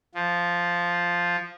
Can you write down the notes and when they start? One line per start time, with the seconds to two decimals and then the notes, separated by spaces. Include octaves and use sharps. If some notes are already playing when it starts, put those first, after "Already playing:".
0.15 F3